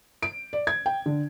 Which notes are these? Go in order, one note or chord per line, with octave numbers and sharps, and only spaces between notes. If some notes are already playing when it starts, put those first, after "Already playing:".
D7
D5
G#6
G5
D3